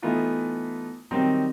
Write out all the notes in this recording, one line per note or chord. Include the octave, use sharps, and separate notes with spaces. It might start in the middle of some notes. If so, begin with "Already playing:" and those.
E3 A3 B3 D#4 F4
D#3 F#3 G3 C4 D#4